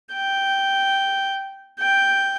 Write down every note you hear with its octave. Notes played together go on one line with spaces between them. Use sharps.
G5
G5